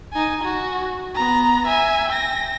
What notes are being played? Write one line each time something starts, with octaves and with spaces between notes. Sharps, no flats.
D#4 G#5
F#4
B3 A#5
E5 G#5
G5 A#6